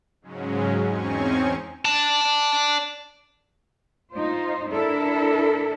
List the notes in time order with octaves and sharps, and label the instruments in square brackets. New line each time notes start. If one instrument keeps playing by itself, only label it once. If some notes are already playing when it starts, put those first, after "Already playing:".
[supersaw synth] G#2 C#3 F#3 G#3 C#4
E2 C4 C#4 D#4 G#5 C#6
[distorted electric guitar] D5 A5
[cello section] D#4 F4 C5
D4 E4 A4 A#4